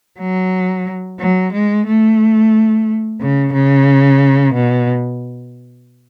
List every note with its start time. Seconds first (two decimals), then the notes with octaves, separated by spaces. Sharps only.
0.19 F#3
1.19 F#3
1.53 G#3
1.87 A3
3.21 C#3
3.53 C#3
4.54 B2